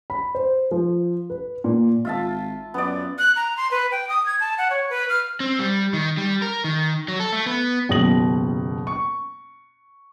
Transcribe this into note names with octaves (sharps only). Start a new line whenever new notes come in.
B5
C5
F3
B4
A#2
G#1 F4 E5 A5
F#2 B3 D5
F#6
A#5
C6
B4
G5
D#6
G#6
A5
F#5
C#5
B4
F6
C4
G3
D#3
G3
A#4
D#3
F#3
A4
A3
B3
F#1 D#2 B2 D#6 A#6 F#7
C#6